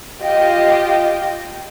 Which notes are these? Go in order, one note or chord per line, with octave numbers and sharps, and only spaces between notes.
F4 G4 D#5